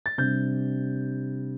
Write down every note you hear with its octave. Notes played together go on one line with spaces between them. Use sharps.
A6
C3 G3 D4 G6